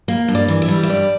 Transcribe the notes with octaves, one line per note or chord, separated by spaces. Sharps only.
A#3
G2
D5
E3
E5
G3
E5
G2 D5